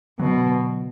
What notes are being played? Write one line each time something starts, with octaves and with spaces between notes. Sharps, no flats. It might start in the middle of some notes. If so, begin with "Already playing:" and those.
B2 D3 F#3